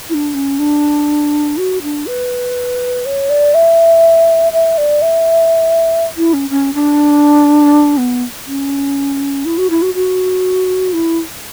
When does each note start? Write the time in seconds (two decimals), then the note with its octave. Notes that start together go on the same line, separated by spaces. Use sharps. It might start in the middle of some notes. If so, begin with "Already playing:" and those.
0.10 E4
0.14 D4
0.34 C#4
0.59 D4
1.57 F#4
1.83 D4
2.07 B4
3.06 C#5
3.30 D5
3.54 E5
4.52 E5
4.78 D5
5.02 E5
6.17 E4
6.33 C#4
6.50 C#4
6.74 D4
7.98 B3
8.47 C#4
9.45 E4
9.58 F#4
9.70 E4
9.82 F#4
9.95 F#4
10.93 E4